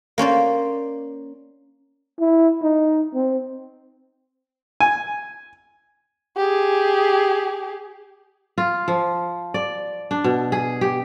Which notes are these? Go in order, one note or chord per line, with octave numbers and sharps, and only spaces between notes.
A#3 C#4 C5 D5
E4
D#4
C4
G#5
G4 G#4
F4
F3
D5
D4
B2
G#4
G4